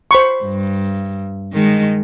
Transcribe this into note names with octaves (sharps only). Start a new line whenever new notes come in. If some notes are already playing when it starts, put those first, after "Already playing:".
C5 B5 C#6
G2
D#3 G#3